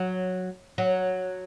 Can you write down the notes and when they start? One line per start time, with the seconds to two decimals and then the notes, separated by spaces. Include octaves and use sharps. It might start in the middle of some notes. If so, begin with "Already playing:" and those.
Already playing: F#3
0.78 F#3